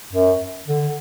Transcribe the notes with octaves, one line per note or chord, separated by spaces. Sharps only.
F#2
D3